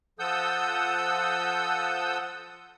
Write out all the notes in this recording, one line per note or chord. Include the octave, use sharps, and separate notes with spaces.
F3 A4 F#5 D#6 E6 G6